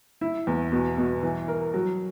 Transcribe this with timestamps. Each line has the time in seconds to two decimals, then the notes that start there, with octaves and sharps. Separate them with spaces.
0.21 E4
0.47 E2
0.72 B2
0.97 B2
1.23 E3
1.48 A#4
1.74 F#3